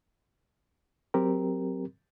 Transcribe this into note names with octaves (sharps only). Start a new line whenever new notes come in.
F#3 C4 G4 A#4